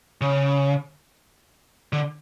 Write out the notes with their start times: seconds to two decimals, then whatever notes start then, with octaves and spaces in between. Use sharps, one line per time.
0.21 C#3
1.93 D3